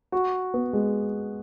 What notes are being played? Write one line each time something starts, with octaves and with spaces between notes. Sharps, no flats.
F#4
B3
G#3